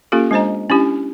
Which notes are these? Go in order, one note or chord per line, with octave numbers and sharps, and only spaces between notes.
A#3 C#4 F4 G4 A4
G#3 D4 C5 D#5 A#5
C#4 D4 E4 G4